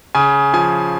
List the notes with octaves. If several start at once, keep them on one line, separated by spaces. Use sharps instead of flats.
C#3 G#5
F3 G#5